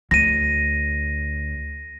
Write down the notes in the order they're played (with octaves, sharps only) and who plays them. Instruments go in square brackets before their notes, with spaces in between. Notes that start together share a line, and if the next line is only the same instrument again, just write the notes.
[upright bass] D2 [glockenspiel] A#6 D#7